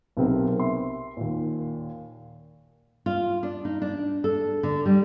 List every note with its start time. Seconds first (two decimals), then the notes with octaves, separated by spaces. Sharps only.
0.17 B1 C3 B3 C4 G#4 A#4
0.60 E5 C6
1.17 D#2 A#2
3.06 F4
3.43 D4
3.65 D#4
3.82 D4
4.24 A4
4.63 D3
4.86 G3